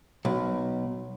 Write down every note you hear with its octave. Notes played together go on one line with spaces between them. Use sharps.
B1